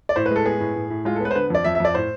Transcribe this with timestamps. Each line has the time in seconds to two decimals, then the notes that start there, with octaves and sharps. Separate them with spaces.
0.09 D5
0.16 A2 C5
0.26 B4
0.31 G#3
0.36 A4
0.45 B3 G#4
0.60 A2
0.76 A2
0.90 A2
1.05 G#3 F4
1.16 A4
1.21 B3 B4
1.31 C5
1.36 D3 B4
1.50 F2 D5
1.64 F2 E5
1.75 E5
1.80 F2 D5
1.95 A2 C5